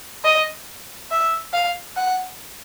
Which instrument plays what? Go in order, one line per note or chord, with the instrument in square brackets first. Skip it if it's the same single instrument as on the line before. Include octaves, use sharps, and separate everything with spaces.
[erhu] D#5
E5
F5
F#5